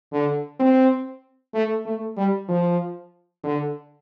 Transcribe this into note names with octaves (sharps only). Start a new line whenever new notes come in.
D3
C4
A3
A3
G3
F3
D3